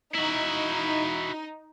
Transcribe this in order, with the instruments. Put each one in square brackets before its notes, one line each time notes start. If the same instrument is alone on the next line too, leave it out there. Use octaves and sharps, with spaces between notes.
[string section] D#4 [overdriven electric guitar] E4 F#4